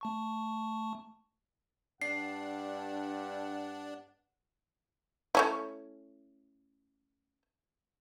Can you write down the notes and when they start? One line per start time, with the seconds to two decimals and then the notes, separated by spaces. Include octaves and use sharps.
0.01 A3 A5 C#6
2.02 G2 D4 F#5 C7
5.35 A3 C#4 E4